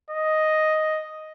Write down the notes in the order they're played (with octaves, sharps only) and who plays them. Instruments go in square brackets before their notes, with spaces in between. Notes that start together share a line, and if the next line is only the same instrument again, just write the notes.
[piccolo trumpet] D#5